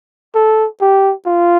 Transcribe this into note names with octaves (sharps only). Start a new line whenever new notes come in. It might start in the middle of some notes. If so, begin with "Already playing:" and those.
A4
G4
F4